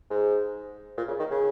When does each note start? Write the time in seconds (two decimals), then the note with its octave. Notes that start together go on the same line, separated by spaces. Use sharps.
0.10 G#2
0.97 A#2
1.08 C#3
1.19 D#3
1.30 C#3